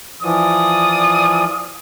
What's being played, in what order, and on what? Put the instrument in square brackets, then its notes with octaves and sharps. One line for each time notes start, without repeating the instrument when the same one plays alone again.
[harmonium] E3 F3 [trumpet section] F4 D5 D#6